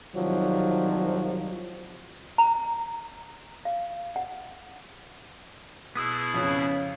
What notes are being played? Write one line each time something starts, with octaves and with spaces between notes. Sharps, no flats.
C2 D#3 F3 F#3
A#5
F5
F#5
B2 B3 E4 G#4 D#6 E6
F2 C#3 C#4